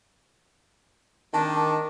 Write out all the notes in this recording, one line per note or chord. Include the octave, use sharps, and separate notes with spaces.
D#3 D4 A5